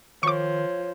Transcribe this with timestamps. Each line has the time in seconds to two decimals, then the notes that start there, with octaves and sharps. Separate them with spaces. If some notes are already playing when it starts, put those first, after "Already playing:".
0.23 D#3 F3 C#5 C#6 D6